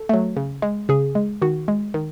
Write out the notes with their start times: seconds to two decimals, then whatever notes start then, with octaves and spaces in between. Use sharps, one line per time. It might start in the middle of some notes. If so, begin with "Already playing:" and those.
Already playing: A4
0.09 F#3 A3
0.37 C#3
0.62 G#3
0.89 C#3 G#4
1.15 G#3
1.42 D#3 F#4
1.68 G#3
1.94 D#3